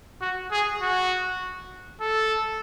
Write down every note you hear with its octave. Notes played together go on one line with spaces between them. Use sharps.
F#4
G#4
F#4
A4